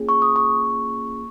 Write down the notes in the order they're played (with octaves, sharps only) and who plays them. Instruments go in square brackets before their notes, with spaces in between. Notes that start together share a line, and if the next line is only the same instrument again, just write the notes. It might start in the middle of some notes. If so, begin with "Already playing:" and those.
Already playing: [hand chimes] A#3 C#4 F4 G#4
C#6
D#6
C#6